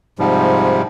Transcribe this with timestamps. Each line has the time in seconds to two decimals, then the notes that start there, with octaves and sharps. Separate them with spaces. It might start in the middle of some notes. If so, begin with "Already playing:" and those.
0.19 G#2 C3 F3 G3